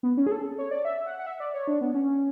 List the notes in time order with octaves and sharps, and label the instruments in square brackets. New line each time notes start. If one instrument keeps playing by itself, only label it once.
[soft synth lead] B3
C#4
G#4
A4
C#5
D5
E5
F#5
F#5
E5
D5
C#5
D4
B3
C#4